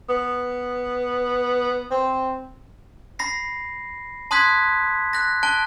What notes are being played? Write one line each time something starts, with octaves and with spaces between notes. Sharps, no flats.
B3
C4
B5 A#6 C7
A5 C6 D#6 F#6 G#6 B6
F#6 A#6
A5 F#6 D7 G7